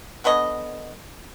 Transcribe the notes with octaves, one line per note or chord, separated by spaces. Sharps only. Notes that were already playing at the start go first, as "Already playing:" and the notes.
D3 B3 C#5 D#5